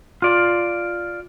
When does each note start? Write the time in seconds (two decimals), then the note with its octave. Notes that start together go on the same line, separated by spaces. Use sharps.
0.22 F4 D5